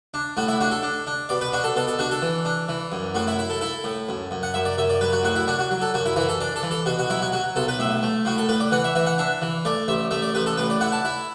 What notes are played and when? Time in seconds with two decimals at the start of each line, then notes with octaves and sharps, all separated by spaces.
0.14 D4
0.37 A2 F#4
0.48 E4
0.61 D4 F#4
0.71 A4
0.83 D4
1.07 D4
1.29 B2 D5
1.41 B4
1.52 D4 F#4
1.64 A4
1.76 B2 A4
1.87 A4
1.99 D4 F#4
2.11 A4
2.22 E3
2.45 D4
2.69 E3
2.92 F#2
3.15 A2 F#4
3.27 E4
3.39 E4
3.50 A4
3.61 E4 A4
3.84 A2
4.09 F#2
4.31 F#2
4.43 F#5
4.54 F#2 E5
4.65 D5
4.77 F#2 E5
4.90 D5
5.01 F#3 B4
5.13 F#4
5.23 A2 F#4
5.36 E4
5.47 D4 F#4
5.59 F#4
5.71 F#3
5.81 A4
5.94 F#2 F#4
6.06 E4
6.16 E3 E4
6.29 A4
6.40 D4 D5
6.56 A4
6.63 E3
6.71 A4
6.86 B2 F#4
6.99 F#4
7.10 F#3 E4
7.22 F#4
7.32 F#3 F#4
7.56 B1 A4
7.68 B4
7.79 A2 E5
8.03 A3
8.25 A2 F#4
8.38 A4
8.49 A2 B4
8.60 D5
8.72 E3 F#5
8.84 E5
8.95 E3 E5
9.06 F#5
9.18 D4 E5
9.42 E3
9.65 A3 D5
9.88 A1 E5
10.11 A3 E5
10.22 D5
10.34 A1 B4
10.46 A4
10.57 A2 B4
10.70 D5
10.81 E4 F#5
10.92 A5
11.05 E4